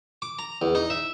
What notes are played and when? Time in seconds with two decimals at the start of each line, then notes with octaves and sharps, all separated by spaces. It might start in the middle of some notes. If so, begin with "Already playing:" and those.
0.22 D6
0.39 A#5
0.62 E2
0.75 D#4
0.90 E5